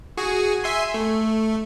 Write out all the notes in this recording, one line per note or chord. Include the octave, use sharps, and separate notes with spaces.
F#4 G#4 G#5
E5 G#5 C6
A3